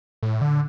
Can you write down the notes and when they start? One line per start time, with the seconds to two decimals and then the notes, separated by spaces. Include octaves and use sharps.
0.23 A2
0.41 D3